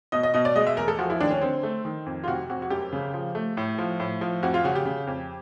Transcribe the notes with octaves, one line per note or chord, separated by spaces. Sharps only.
B2 D#5
D#5
B2 D#5
D5
G#3 D#5
E5
E2 A#4
A4
F3 F#4
E4
D#2 D4
C#4
D3 C4
A3
D#3
F2
F4
C3 F#4
F2 F#4
F#4
F#2 G4
C#3
F3
A3
A2
F3
A2
F3
F2 F#4
F4
C#3 F#4
G4
C#3
F2